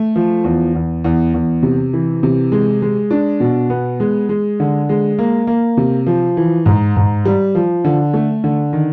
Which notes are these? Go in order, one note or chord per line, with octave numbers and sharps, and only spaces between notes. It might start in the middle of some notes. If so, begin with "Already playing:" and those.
Already playing: A3
F3
E2
E2
E2
E2
C3
E3
C3
G#3
G#3
D4
B2
B3
G#3
G#3
D3
G#3
A#3
A#3
C3
F3
E3
G#2
G#2
G3
F3
D3
A3
D3
D#3